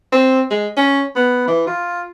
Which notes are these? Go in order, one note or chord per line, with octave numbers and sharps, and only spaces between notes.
C4
G#3
C#4
B3
E3
F4